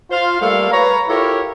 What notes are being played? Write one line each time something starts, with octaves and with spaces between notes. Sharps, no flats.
F4 C5 F5
G3 A3 A#3 A4 F5
B4 C#5 A#5
E4 F4 G4 A4 A#4 C#5